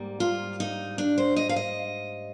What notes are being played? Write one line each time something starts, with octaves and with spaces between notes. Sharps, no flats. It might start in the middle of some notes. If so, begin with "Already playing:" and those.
Already playing: G#2 G3 A#3
F4
D#4
D4
C5
D#5
F5
D#5